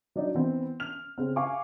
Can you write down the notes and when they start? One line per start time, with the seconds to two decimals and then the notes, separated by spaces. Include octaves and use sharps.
0.16 F#3 D4 D#4
0.34 E3 B3 C4
0.80 F6 F7
1.18 C#3 C4
1.36 F5 G#5 C#6 D6